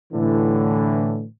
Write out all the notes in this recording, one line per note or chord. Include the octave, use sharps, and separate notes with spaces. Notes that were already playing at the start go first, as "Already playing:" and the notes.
A2 D3 E3